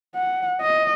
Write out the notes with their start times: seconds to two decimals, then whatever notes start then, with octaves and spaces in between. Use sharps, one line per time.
0.15 F#5
0.61 D#5